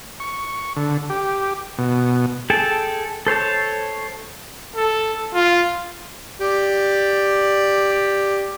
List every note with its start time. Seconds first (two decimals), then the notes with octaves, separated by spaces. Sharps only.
0.20 C#6
0.76 D3
1.10 G4
1.78 B2
2.50 G#4 A4 G5 A5
3.27 A4 C5 C#5 A5
4.76 A4
5.34 F4
6.40 G4 D5